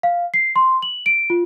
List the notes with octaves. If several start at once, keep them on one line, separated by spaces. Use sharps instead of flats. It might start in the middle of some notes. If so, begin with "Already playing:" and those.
F5
C7
C6
F#7
D7
F4